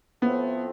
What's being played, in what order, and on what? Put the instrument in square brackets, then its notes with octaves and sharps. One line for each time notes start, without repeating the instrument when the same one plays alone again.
[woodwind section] A2 F3 A3 C4 [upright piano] B3